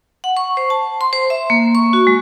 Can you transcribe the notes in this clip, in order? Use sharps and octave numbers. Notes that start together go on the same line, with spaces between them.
F#5
C#6
C5
A5
C6
C5
E5
A#3
C#6
F#4
G#3